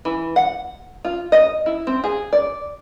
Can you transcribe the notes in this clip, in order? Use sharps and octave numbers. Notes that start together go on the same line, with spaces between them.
E3
F#5
F4
D#5
E4
C4
G#4
D5